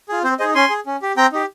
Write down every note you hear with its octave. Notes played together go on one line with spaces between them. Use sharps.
F4 G#4
C4 C5
D#4 G#4 C5 D#5
C#4 G#5 C6
G#4
C#4
G4
C4 G5 A#5
D#4 G4